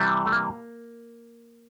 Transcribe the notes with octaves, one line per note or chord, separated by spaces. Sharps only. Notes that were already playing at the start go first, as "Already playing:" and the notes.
Already playing: C3 E3 G3
A3
A#3